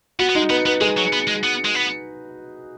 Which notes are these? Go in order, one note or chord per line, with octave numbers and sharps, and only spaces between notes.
B3 F#4
B3
G#3 D#4
B3 B4
B3 B4
G#3 G#4
F#3
B3
G#3
B3
G#3
B3